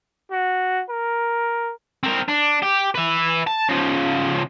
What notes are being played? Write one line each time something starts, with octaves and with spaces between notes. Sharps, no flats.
F#4
A#4
C4 A#4
D4
G4
B4 E5
A5
C#3 F3